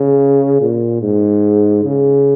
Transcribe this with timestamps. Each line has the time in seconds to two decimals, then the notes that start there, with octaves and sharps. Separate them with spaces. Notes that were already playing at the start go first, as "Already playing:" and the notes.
Already playing: C#3
0.61 A#2
1.01 G#2
1.84 C#3